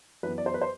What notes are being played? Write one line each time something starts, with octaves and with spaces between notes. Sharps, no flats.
F#2 E3 B3 B4
D5
C5
B4
C5